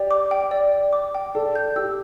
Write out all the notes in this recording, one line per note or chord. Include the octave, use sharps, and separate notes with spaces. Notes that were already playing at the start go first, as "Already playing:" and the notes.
Already playing: G4 D5
D6
G5
D5
D5
D6
G5
A4 D5
G6
G4 E6